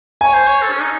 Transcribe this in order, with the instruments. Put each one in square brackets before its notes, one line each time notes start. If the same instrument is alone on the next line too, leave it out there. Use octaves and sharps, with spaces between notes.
[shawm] C#5 [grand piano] G#5
[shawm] C5
C#5
A4
C#4
D#4